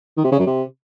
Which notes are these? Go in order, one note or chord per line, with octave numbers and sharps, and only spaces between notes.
D#3
C3
C#3
F#2
C3